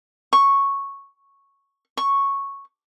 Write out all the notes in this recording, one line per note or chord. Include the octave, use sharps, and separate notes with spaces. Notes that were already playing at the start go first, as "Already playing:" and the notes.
C#6
C#6